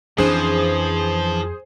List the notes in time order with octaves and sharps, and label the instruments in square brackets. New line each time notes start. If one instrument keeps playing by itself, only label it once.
[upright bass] F2 [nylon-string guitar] E3 C#4 D4 [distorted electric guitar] F3 [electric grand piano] G#4 C5